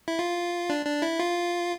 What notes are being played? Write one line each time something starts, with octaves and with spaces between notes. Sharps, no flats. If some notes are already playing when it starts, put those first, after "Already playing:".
E4
F4
D4
D4
E4
F4